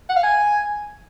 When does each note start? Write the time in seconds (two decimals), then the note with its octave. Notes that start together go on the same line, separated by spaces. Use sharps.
0.09 F#5
0.16 F5
0.23 G#5